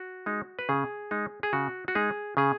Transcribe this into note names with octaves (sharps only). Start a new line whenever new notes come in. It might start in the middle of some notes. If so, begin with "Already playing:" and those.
Already playing: F#4
G#3 D#4
B4
C#3 G#4
G#3 D#4
G#4
C#3 F#4
F#4
G#3 D#4 G#4
C#3 G#4